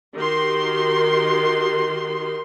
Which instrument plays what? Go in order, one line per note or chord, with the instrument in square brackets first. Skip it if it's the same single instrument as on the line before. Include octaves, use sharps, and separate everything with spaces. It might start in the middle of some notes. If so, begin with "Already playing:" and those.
[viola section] D#3 F#4 G4 C6